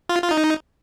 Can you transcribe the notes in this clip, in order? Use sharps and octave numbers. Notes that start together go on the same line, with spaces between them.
F4
F4
D#4